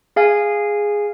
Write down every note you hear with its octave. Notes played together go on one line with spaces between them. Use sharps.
G#4 F5 G#5